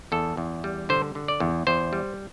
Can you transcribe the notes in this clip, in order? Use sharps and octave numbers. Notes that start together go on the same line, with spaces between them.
E2 A4
E2
G3
D3 C5
D3
D5
E2
E2 C5
G3